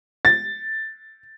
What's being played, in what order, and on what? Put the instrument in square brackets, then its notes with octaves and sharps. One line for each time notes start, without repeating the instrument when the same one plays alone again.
[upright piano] A6